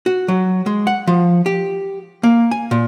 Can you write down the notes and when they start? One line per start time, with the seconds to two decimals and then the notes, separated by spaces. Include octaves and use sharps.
0.06 F#4
0.28 F#3
0.66 G#3
0.87 F#5
1.07 F3
1.46 G4
2.23 A#3
2.51 G#5
2.71 A#2